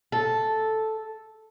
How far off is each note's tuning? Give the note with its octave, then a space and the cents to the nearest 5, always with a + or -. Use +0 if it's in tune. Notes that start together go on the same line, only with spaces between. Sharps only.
A4 -5